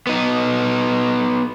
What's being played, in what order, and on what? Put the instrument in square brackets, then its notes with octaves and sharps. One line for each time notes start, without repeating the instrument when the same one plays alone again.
[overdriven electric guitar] B3 D#4